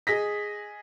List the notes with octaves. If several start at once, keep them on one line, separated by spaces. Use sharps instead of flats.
G#4 D#5 A#6 B6